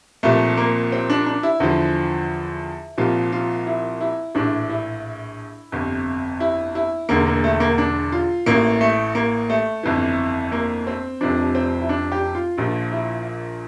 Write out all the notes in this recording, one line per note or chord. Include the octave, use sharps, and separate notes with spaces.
C2 A#2 F3 A3
A#3
C4
D4
D4
E4
E2 D3 F3
C2 A#2 F3 F4
F4
E4
E4
A#1 A2 E3 D4
E4
G1 F2 C3
E4
E4
E1 E2 D3 A#3
A#3
A3
A#3
D4
F4
A1 A2 E3 A#3
A3
A#3
A3
G1 F2 E3
A#3
C4
F1 F2 C3 F3 D4
C4
E4
D4
G4
F4
A#1 A#2 F3 F4
E4